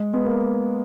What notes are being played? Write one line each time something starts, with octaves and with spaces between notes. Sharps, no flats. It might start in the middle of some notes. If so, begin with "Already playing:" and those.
Already playing: G#3
G#3 B3
A#3